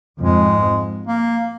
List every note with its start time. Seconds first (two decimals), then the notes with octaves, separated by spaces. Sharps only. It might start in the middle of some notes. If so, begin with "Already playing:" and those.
0.22 F2 G#2 G#3
1.07 A#3